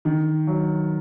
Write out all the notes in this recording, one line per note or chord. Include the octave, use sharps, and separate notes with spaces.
D#3
F#3